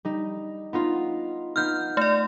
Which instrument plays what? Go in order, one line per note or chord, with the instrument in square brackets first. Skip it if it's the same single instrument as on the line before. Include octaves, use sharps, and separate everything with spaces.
[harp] G3 D#4
B3 D#4 F4
[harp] B3 D#4 F4 [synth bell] F6 G6
[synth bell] A3 D5